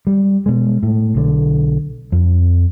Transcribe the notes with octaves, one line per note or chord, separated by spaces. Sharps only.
G3
B2 G#3
A2
B1 D3
F2